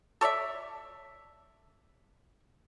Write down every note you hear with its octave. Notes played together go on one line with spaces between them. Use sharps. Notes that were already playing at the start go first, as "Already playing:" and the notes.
A4 C#5 D5 E5